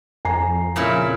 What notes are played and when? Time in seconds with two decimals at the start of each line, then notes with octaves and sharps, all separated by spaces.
0.25 F2 G#5 A#5 C7
0.76 A#2 C#3 E4